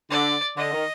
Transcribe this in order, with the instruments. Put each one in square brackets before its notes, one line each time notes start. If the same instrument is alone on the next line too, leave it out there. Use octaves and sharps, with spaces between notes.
[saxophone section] D3 [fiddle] D5
[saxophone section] D3 [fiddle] D#5
[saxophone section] D#3